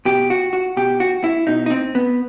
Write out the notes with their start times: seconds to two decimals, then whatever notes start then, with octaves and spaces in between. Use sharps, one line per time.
0.05 B2 G4
0.30 F#4
0.53 F#4
0.77 B2 G4
1.00 F#4
1.24 E4
1.47 B2 D#4
1.66 D#4
1.70 C4
1.95 B3